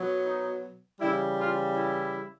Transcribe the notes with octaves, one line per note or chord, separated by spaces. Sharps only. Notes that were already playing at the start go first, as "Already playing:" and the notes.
Already playing: B2 F#3 B3
D#4
C#3 E3 G3 E4
F4
E4